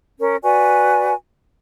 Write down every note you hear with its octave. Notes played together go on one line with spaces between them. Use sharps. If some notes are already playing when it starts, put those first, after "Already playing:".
C#4 A#4
F#4 B4 D5 G#5